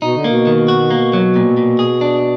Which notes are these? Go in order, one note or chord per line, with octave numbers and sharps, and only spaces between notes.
B2 D#4
D3
B2 A#3
D#3
F#4
A#3
F#3
A#2
A#2
G#4
D4